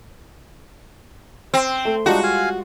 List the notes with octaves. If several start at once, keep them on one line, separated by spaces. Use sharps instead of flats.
C4
A3
G3 G#3 D4 D#4 F4 F#4
F5 G#5